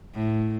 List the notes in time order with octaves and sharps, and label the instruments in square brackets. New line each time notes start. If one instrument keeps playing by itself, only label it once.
[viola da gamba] A2